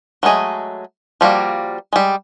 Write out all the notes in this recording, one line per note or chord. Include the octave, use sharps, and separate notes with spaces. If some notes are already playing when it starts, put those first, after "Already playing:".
F#3 G#3 A3 G#4 D#5
F3 G3 A#3 F#4
G3 G#3